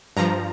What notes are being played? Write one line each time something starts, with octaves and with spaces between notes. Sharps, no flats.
G2 F3 A#5